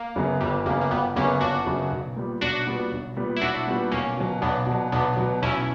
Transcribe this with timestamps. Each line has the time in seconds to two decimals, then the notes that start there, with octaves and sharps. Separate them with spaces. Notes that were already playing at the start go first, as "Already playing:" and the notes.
Already playing: A#3
0.16 F#2 C#3 F#3 B3
0.40 G1 G3
0.66 F#2 C#3 F#3 A#3 B3
0.81 A#3
0.91 G1 G3 B3
1.16 F#2 C#3 F#3 A#3 B3 C#4
1.41 G1 D4 F#4
1.66 F#2 C#3 F#3 B3
1.91 B1
2.16 A#2 G3 B3
2.41 B1 D4 F#4
2.67 A#2 G3 B3
2.92 B1
3.16 A#2 G3 B3
3.37 E4
3.41 B1 D4 F#4
3.67 A#2 G3 B3
3.92 B1 A#3 C#4
4.17 B2 F#3
4.42 B1 B3 D4
4.66 B2 F#3
4.92 B1 B3 D4
5.17 B2 F#3
5.42 B1 C#4 E4